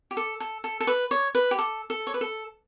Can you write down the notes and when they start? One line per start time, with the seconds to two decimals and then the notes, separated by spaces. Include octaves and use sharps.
0.11 G4
0.17 A4
0.40 A4
0.64 A4
0.80 A4
0.87 B4
1.11 C#5
1.35 B4
1.51 G4
1.59 A4
1.90 A4
2.07 C#5
2.14 B4
2.21 A4